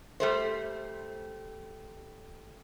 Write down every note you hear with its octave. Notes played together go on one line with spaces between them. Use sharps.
G3 A3 C5